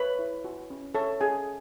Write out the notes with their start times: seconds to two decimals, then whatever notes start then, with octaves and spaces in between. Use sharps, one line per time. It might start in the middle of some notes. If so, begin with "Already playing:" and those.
Already playing: B4 C#5 B5
0.19 E4
0.45 F#4
0.70 C#4
0.95 A4 C#5 A5
1.20 C#4 G#4 G#5